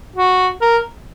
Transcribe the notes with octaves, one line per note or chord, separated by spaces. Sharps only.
F#4
A#4